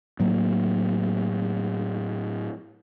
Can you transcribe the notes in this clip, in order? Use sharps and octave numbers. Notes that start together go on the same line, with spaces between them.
A2 F#3 A#3